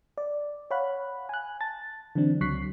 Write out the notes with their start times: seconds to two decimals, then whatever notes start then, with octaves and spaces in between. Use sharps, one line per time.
0.18 D5
0.71 C#5 F5 F#5 B5 F#6
1.29 G#5 F#6
1.61 A5 A6
2.15 D3 E3 F#3 C4 D4
2.41 C#2 F#3 C#6 F#6 B6 C7